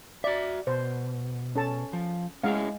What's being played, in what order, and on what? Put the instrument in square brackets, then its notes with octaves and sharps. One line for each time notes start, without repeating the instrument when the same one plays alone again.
[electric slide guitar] F#4 E5 [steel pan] D5
[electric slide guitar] B2 [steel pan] C5
[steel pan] C#4 A4 A5
[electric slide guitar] F3
[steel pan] G#3 F5 [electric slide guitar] C#4 E4 G#4